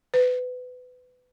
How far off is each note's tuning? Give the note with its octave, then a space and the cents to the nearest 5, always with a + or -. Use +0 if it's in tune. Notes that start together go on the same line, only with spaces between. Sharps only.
B4 +25